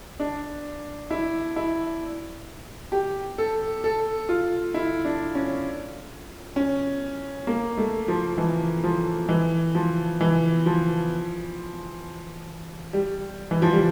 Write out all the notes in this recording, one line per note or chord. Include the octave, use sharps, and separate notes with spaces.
D4
E4
E4
G4
A4
A4
F4
E4
D4
C#4
C#4
A#3
A3
F3
E3
F3
E3
F3
E3
F3
G3
E3
F3
G3